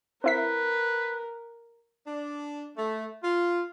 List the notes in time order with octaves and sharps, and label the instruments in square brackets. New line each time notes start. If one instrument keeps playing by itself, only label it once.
[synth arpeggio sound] C4 E4 B6 [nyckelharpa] A#4 [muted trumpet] B4
[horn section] D4
A3
F4